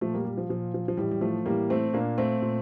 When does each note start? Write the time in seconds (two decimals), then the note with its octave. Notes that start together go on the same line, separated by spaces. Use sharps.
0.01 A#2 F3 A3
0.14 G3 A#3
0.25 G3
0.37 F3
0.49 A#2 F3
0.74 F3
0.88 F3
0.97 A2 E3 G3
1.11 G3
1.21 F3 A3
1.46 A2 E3 G3 A#3
1.70 A3 C4
1.93 A#2 A#3 D4
2.18 A3 C4
2.42 A#2